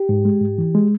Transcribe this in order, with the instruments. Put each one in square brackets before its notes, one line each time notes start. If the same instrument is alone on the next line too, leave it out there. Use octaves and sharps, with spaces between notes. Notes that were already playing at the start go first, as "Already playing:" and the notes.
Already playing: [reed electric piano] G4
G#2
G#3
G#2
E3
G#3